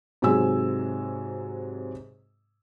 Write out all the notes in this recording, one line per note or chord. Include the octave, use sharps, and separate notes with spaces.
G#2 C3 F#3 G#3 G#5 E6